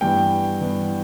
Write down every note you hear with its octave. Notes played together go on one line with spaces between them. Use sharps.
G2 E3 B3 G5
G2 E3 B3